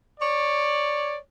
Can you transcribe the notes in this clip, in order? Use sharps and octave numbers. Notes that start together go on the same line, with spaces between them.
C#5 D5